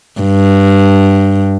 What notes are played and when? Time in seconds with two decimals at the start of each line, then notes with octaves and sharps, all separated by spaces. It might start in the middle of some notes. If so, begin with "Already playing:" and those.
0.21 G2